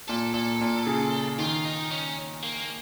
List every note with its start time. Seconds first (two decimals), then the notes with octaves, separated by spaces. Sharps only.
0.08 A#2 A4
0.34 A#2 A4
0.61 A#2
0.87 C#3
1.38 D#3 F4
1.65 D#4
1.91 C#4
2.43 A#3